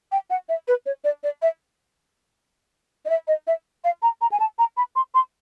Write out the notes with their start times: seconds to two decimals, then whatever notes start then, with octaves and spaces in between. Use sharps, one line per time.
0.12 G5
0.30 F#5
0.49 E5
0.68 B4
0.86 C#5
1.04 D5
1.23 D5
1.42 E5
3.05 D#5
3.09 E5
3.27 D#5
3.47 E5
3.84 F5
4.02 A#5
4.21 A#5
4.32 G#5
4.40 A5
4.58 A#5
4.77 B5
4.96 C6
5.14 C6